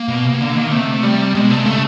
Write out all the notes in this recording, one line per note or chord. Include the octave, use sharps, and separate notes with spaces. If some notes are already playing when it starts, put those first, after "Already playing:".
Already playing: A#3
B2
C3
D3
D#3
C3 A3
G3
B2 G#3
C3 A3
G#3
C#3 A3